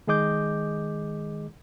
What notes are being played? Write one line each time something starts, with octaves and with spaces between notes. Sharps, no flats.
D#3 G#3 G#4 D#5 D6 G6